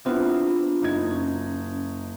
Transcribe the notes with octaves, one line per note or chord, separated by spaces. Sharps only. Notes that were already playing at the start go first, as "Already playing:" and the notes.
B3 C4 D4 E4 F4
F#1 D#4 G#6
C#4